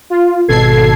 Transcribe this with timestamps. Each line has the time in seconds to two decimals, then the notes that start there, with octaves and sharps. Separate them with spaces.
0.10 F4
0.48 G#1 B2 A4 G#6 C7